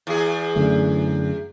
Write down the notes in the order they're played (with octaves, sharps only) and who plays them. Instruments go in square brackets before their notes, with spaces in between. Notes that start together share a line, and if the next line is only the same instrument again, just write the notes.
[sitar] E2 G#4
[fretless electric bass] F#2 D3 A3